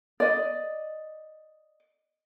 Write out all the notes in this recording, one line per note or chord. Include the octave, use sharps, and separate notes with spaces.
D5 D#5